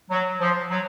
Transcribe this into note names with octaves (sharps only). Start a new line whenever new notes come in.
F#3
F3
F#3